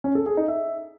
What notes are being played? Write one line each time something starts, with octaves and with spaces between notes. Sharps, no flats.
C#4
A4
G#4
D#4
E5